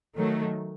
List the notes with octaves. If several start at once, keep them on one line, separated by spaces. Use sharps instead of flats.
D#3 F#3 A3